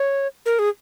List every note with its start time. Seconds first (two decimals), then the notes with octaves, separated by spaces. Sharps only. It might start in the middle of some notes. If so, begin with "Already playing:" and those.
Already playing: C#5
0.46 A#4
0.59 G#4